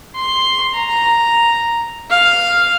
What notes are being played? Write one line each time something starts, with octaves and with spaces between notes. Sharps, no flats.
C6
A#5
F5